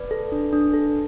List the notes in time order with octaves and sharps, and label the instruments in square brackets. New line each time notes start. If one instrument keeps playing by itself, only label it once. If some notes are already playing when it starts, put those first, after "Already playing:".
Already playing: [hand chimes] B4 D5
A4
D4
D4
A4